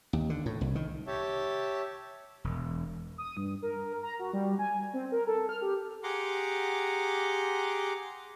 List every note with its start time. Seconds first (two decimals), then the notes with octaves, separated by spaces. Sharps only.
0.13 D#2
0.30 D3
0.46 A2
0.61 C2
0.75 D#3
1.07 G4 C#5 E5 A5
2.44 E1
3.18 D#6
3.37 G2
3.62 A#4
4.03 A#5
4.19 F#4
4.33 G3
4.59 G#5
4.93 C4
5.12 A#4
5.27 A4
5.49 F6
5.61 G4
6.03 G4 G#4 F#5 A#5 C6 D6